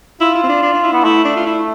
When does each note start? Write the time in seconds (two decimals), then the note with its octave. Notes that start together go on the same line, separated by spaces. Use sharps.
0.21 E4 F4
0.35 E4
0.43 C4
0.49 D4
0.63 D4
0.73 D4
0.83 E4
0.93 B3
1.04 A3 E4
1.25 D4
1.36 F4
1.46 E4